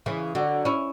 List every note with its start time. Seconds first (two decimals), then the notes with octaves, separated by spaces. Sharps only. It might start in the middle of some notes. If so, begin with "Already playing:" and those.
0.06 C#3 E3
0.35 D3 F#3
0.65 C#4 E4